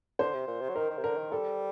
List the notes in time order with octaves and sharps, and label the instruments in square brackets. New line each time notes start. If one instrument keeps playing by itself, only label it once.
[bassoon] D3 [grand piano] C5
[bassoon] C3
A#2
C3
F#3
[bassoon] D#3 [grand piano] A#4
[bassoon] D#3
C3
[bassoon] D3 [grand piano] A#4
[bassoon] D#3
[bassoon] G3 [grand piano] A4